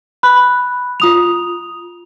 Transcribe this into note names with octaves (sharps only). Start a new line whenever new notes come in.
B5 F#6
F4 D#6 F7